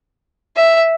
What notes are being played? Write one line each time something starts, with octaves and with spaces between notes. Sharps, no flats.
E5